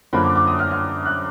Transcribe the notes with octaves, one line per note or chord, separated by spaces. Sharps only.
F#2 D3 F3 A#3 B5
D6
D6
D#6
F6
F6
F#6